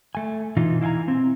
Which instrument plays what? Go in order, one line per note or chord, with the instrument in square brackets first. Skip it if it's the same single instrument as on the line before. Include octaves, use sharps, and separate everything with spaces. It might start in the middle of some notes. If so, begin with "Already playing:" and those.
[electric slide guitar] A3 G#5
B2 E3 D#4 F4
E4 F5 G5 G#5 A#5
C4